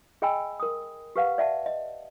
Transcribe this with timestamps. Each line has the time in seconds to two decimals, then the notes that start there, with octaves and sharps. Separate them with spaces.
0.22 G#4 D#5 G5 G#5 B5 E6
0.60 A#4 D#6
1.16 G4 B4 F5 F#5
1.38 D5 E5 F#5 A5
1.66 D#5